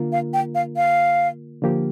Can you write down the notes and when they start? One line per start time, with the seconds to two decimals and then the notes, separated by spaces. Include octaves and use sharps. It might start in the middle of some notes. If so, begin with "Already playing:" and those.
Already playing: D3 A#3 F4 A#4
0.12 F5
0.34 G5
0.55 F5
0.76 F5
1.62 D3 F3 A#3 G4